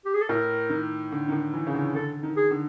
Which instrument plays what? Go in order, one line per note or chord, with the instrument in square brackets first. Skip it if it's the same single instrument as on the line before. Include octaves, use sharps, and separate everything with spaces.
[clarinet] G4
G#4
A4
[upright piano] A2 [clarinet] A#4
[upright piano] D#3
D3
D#3
D3
E3
C#3
D3
[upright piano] D3 [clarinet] A4
[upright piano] D#3
[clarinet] G#4
[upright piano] D3